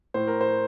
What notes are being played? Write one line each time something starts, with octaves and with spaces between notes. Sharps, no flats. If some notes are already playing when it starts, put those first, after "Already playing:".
A2 C5
A#4
C5